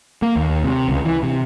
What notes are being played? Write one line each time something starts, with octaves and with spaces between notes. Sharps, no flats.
A#3
D#2
C3
C#2
E3
C3